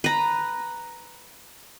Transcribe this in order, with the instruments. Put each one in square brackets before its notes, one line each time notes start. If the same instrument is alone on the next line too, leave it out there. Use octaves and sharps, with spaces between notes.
[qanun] B4 A#5